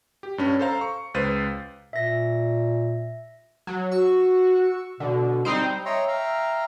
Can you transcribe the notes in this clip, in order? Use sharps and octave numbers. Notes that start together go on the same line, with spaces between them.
G4
G2 C#4
A4 C5 F5 A#5
C#6
C#2 B4 C5 A6 D#7
A#2 E5 A#6
F#3
F#4 C#6 E6
B2 D3
G3 C4 D#4 C5
C#5 D#5 E5 G5 A#5 C6
E5 F5 G5 A#5